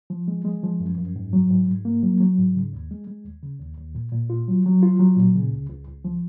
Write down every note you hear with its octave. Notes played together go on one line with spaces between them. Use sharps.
F3
G#3
G#3
F3
F#2
F#2
G#2
F#3
G#2
G#2
A#3
F#3
F#3
G#2
C#3
D#2
G#3
G#3
D#2
C#3
D#2
D#2
A#2
A#2
F4
F#3
F#3
F4
F#3
A#2
C#3
C#2
C#2
C#2
F3